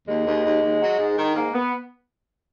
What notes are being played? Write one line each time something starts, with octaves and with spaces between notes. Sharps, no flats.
D#2 G#3
D#2
D#2
D#2
F#3
G#2
D#3
G#2 A#3
B3